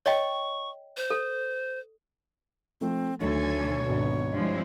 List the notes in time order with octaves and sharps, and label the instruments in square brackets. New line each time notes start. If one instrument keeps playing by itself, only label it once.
[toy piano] C#5 D#5 G5 [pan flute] C#6
[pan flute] C5
[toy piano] A4
[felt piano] F3 A3 [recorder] C4
[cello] D2 A4 [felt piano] D#3 F#3 A3 [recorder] C#5 [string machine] G#5 G#6
[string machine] B2
[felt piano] G#1 D4
[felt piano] G2 [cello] F3 G#3 [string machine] C4 E4